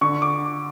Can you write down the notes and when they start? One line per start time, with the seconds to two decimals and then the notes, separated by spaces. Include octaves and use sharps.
0.01 D3 C#6
0.22 D6